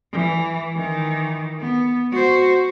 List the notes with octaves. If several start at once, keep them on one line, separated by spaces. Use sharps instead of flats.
E3
D#3 E3
B3
F#4 C5